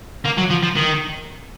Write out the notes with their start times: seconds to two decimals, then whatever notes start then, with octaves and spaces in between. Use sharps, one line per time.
0.25 A#3
0.37 F#3
0.50 F3
0.63 F3
0.76 D#3